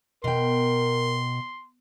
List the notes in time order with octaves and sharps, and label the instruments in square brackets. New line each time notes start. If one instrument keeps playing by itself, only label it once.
[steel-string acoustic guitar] B2 G5 [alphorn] A#4 [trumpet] C6